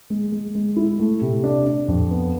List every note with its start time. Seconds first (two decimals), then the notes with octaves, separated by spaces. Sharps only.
0.10 G#3
0.32 G#3
0.55 G#3
0.77 E4
0.99 A3
1.22 C3
1.44 D4
1.66 D4
1.88 F2
2.11 B3